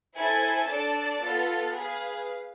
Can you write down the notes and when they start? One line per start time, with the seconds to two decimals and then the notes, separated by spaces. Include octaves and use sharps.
0.15 E4 A4 C5 G#5
0.68 D4 A4 D5 A5
1.21 B3 F4 A4
1.74 G#4 B4 F5